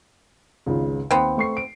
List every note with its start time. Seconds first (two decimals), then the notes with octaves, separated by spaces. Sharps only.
0.66 G#1 C#2 C#3
1.11 D#2 B3 C4
1.37 A3 C#6 C7
1.57 D7